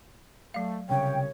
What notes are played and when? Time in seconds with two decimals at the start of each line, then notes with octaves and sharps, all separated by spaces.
0.54 F#3 A3 F5
0.89 C2 C#3 C#5 G5